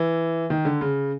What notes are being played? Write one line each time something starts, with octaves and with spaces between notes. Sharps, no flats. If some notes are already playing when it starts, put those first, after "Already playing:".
Already playing: E3
D#3
D3
C#3